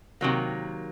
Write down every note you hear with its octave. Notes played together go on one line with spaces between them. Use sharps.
C3 D#3 F#3 A#3